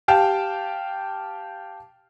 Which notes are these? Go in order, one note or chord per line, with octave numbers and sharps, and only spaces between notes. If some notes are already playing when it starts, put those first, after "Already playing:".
G4 F5 G5 A5